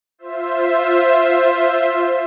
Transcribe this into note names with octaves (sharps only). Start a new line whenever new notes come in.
F4 C5 E5